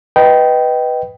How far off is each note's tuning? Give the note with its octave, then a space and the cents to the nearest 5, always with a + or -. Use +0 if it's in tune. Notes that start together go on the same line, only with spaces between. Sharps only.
B4 +0 D#5 +0 G5 -15